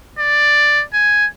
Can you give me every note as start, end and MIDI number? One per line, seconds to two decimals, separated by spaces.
0.19 0.84 74
0.93 1.27 80